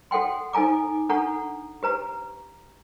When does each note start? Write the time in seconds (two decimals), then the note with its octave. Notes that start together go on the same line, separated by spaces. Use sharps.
0.11 F#4 A4 F#5 G5 C6
0.53 D#4 A4 G#5 A#5 D6
1.09 D4 A4 F#5 A#5 C#6
1.83 G4 B4 A#5